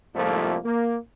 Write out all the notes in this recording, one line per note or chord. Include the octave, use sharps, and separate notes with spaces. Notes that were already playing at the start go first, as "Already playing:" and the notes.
C2 F2 G#2 F3 A3 A#3
A#3